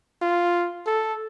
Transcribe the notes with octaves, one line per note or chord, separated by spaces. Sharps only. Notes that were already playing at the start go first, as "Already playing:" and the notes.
F4
A4